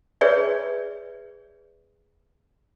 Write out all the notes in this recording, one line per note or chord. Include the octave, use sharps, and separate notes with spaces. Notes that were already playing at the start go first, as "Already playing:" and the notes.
G#4 B4 C#5 D5 E5